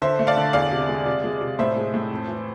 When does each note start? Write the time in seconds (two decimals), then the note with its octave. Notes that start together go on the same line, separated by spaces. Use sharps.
0.02 D3 C5 E5
0.19 A3
0.27 D5 F5
0.37 D3
0.53 E2 D5 F5
0.72 C3
0.89 G#3
1.06 C3
1.24 G#3
1.41 C3
1.59 A2 C5 E5
1.77 G#3
1.94 A2
2.11 F2
2.28 E3